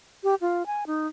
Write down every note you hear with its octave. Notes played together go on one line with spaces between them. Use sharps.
G4
F4
G#5
D#4